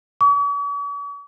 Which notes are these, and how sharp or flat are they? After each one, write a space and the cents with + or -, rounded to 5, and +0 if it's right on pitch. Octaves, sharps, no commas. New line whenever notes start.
C#6 +45